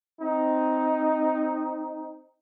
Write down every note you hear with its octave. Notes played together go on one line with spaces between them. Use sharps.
C4 D#4